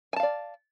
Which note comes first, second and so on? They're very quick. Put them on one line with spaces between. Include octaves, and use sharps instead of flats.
G#5 A5 F5 D5